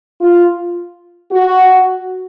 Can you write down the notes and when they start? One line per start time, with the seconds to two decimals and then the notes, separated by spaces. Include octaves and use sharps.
0.21 F4
1.31 F#4